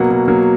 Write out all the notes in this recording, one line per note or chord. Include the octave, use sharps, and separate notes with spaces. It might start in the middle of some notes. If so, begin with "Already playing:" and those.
Already playing: B2 F#3 A#3 F#5
B2
F#3 A#3